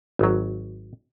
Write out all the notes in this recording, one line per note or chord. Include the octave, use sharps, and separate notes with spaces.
G#1 F#3